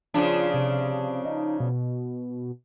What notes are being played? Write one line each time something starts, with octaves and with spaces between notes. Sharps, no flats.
C#3 F3 D4 F4
C3
D#4
B2